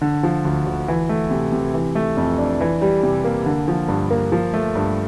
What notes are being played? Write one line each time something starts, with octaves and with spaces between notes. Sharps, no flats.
D3
F3
D2
D2
E3
A3
C3
C3
E3
A3
F2
D4
E3
G3
C3
A#3
D3
F3
G2
A#3
F3
A3
G2